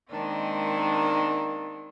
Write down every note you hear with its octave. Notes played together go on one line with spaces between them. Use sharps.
D#3 G#3 A#3 C4 D4